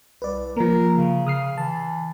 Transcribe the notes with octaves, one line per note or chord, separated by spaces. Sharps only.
C2 B4 D5
F3 A#3 A#4
C#3
C#3 D#6 F6 C7
E3 A5